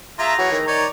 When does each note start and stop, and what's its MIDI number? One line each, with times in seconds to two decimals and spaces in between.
0.19 0.65 57
0.19 0.36 65
0.19 0.65 68
0.19 0.34 76
0.19 0.65 82
0.38 0.60 52
0.38 0.48 66
0.38 0.57 73
0.52 0.86 51
0.67 0.87 63
0.67 0.87 73
0.67 0.88 74
0.67 0.85 92